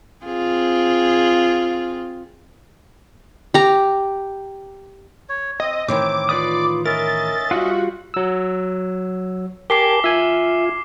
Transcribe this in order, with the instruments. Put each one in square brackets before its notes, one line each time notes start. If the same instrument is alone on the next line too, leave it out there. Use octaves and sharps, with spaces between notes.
[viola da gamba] C4 F4 G#4
[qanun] G4 A#5
[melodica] C#5
[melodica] C4 [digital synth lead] D#5
[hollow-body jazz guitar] A2 D#3 E3 [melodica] C4 [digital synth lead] D6
[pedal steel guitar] F4 B4 D#6 [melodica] D5 [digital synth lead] D6
[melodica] C#4 D#5 E5 [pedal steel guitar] A#4 [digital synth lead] A6
[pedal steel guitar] G3 F4 [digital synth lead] F#4
[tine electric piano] F#3 E6
[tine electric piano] G4 [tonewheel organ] A#4 G#5 A5 [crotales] D6 C7 G7
[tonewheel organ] F4 [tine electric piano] E5 G#5